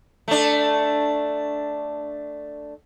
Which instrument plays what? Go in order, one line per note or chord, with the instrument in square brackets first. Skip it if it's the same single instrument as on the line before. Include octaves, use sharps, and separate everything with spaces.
[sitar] A3 D4